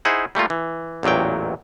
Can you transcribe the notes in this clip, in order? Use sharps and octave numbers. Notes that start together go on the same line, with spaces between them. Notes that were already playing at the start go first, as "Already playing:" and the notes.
D#4 E4 G#4 C5 F#5
G3 A3 A#3 F4
E3
A1 E2 A#2 F#3 G5